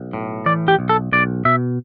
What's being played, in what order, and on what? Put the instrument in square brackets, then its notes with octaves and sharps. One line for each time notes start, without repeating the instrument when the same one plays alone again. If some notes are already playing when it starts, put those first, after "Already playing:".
Already playing: [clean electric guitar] B1
A2
E3 D5
G4
B1
A4
B1 D5
B2 E5